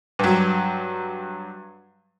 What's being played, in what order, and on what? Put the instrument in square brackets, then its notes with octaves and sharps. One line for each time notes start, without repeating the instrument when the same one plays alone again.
[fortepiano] G2 F#3